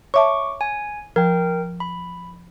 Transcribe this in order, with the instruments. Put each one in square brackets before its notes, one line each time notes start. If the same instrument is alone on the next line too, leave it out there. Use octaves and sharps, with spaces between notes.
[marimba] C#5 E5 A5 [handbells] C#6 D6
[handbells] G#5
[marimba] F3 [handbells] A#4 G5
[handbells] B5